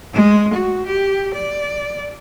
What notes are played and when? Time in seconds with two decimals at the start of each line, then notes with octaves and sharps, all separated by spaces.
0.14 G#3
0.53 F#4
0.86 G4
1.34 D5